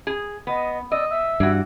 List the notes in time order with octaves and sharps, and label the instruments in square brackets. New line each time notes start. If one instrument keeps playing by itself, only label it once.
[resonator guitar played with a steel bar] G#4
[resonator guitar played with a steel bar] B3 [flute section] D#5
[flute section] D5 E6 [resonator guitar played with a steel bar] D#5
[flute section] E5 E6
[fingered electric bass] G2 [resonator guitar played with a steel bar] E3 F#4